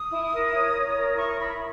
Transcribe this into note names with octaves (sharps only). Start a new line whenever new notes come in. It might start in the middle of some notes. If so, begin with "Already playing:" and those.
Already playing: D#6
E4
A#4
C#5
C#5
A#4
E4 C#6
E4 B5